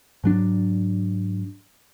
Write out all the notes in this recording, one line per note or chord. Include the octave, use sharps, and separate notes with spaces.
G#2 F#3 D4